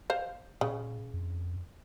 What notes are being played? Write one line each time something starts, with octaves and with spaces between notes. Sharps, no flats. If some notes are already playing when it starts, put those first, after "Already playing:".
C5 F5
A#2 C#3
F2